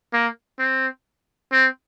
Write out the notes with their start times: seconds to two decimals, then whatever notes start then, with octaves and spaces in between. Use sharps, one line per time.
0.13 A#3
0.59 C4
1.52 C4